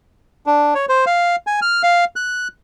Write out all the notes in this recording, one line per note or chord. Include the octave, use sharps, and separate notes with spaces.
D4
C#5
C5
F5
G#5
F6
F5
F#6